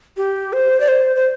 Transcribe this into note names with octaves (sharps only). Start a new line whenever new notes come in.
G4
C5
D5
C5
C5